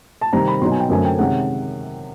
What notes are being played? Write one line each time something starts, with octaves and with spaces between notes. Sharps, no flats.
A5
C3 D#3 G3 C4 A#5
B5
B2 F#3 B3 D#4 C6
G#5
G5
F#2 D3 F#3 A3 C4 G#5
G5
C3 D#3 G#3 C#4 F#5